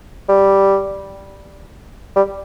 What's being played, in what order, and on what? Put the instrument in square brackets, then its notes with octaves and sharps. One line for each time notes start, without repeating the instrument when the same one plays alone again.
[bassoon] G3
G3